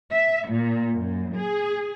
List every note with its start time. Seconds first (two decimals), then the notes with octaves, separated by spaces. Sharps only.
0.12 E5
0.50 A#2
0.97 F#2
1.37 G#4